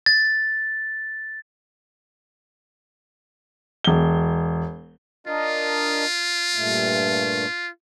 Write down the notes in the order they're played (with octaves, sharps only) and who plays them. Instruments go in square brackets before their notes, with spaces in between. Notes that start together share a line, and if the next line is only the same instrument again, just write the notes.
[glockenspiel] A6
[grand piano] E1 G7
[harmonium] D4 A#4 D#5 [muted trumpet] F4
[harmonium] G2 A#2 A3